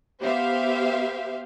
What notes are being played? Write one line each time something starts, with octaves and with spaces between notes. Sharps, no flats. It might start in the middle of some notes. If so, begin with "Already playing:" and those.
B3 G4 C5 E5 F5